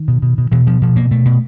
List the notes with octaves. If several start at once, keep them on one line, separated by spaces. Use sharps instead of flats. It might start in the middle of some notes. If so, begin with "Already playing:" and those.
Already playing: D#3
B2
B2
B2
B2 E3
B2 F3
B2 F3
B2 A#3
B2 A3
B2